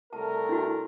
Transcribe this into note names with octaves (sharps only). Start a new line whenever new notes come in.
C2 A3 A#4 A5
D4 E4 F#4